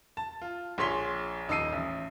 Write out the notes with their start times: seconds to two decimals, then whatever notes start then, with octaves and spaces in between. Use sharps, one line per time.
0.17 A5
0.41 F4
0.78 A#1 G#4 C#5 C6 B6 G7
1.48 D#1 D#4 A5 E6 C7 D#7
1.73 A1